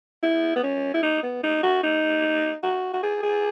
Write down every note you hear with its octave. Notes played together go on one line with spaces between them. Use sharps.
E4
B3
C#4
E4
D#4
B3
D#4
F#4
D#4
F#4
F#4
G#4
G#4